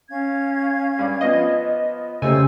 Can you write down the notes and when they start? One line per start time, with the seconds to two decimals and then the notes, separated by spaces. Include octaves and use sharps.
0.09 C#4 F5 G#6
0.99 G2 D5
1.21 F3 B3 D5 D#5
2.22 C#3 A3 A#3 C#4 G4 C5 G#5 E6